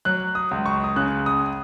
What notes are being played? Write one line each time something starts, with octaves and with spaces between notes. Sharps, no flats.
F#3 F#6
D#6
C#2
C#6
D#6
C#3 F#6
D#6